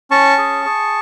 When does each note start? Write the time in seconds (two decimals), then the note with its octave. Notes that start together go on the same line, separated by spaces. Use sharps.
0.11 C#4 A5 C#6
0.38 G#4
0.65 G#4